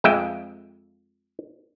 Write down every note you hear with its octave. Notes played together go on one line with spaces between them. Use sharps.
F2 G#3 E5 G5